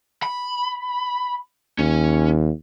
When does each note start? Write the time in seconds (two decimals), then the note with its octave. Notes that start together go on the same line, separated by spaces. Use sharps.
0.23 B5
1.79 D#2 C#4